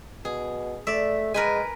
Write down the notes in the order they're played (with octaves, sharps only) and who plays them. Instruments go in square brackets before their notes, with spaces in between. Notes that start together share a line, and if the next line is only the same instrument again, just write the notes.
[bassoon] B2 [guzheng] G#4
[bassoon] A3 [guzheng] D5 E5
[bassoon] G#3 [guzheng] A#4 B4 G#5